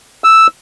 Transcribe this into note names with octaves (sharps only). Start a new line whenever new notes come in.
E6